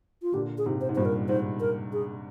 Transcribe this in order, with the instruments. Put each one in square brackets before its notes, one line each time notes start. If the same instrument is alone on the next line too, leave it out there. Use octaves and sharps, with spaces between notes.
[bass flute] F4
[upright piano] A#2 D3 [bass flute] G4
[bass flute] G#4
[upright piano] G#2 C3
[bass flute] C5
[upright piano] G#2
[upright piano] G2 A#2 [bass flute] C5
[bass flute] A#4
[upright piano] G#2 [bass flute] C5
[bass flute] A#4
G#4